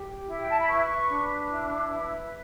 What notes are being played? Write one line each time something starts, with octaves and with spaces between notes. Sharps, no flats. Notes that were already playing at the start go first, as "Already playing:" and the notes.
Already playing: G4
E4
G5
A5
B5
B4 C#6
D4
E4
B4